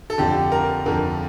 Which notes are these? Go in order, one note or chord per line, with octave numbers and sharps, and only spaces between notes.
A4
F2 D3 G4
A#4
F2 D3 A#4